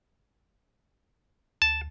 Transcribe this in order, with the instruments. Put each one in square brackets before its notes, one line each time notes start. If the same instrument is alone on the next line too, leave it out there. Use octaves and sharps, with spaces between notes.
[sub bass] D2 [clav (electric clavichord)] A5